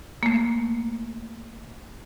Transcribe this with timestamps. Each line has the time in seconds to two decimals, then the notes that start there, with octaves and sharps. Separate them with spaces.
0.23 A3 A#3